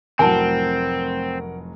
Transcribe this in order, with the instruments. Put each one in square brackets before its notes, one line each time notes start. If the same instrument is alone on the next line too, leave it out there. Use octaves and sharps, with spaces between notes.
[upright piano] F1 A2 F#3 [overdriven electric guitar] C4 [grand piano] A#4 F#5 [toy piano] G#5 A5